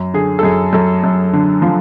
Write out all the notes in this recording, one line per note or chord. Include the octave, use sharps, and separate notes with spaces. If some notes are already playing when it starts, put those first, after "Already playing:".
Already playing: F#2
D3 G#4
A4
F#2 G#4
F#2 A4
F#2
D3
F3